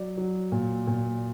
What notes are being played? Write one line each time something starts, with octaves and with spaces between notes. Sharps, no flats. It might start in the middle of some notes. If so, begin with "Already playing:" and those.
Already playing: F#3 D5
F#3
A#2
A#2